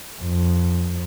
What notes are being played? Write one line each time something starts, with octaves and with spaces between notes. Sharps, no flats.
F2